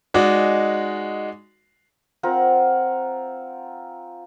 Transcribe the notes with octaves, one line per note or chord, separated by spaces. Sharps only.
G#3 D#4 F#4 D5
C4 F4 A#4 F#5